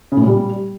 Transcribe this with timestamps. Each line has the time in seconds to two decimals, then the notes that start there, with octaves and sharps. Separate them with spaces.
0.12 C#3
0.17 A2
0.22 A#2
0.27 G3